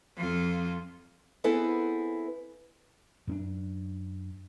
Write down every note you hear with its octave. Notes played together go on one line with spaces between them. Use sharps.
F2 F4
B3 C4 E4 G#4 A4 B4
F#2 C#4 D4